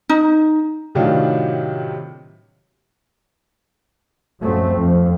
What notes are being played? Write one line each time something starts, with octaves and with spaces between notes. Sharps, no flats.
D#4
A2 C3 D#3 F#3 D4 F4
F#2 F3 A3 C4
F2